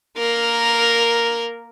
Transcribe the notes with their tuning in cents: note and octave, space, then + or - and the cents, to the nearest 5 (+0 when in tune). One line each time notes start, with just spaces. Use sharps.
A#3 +0 A#4 +0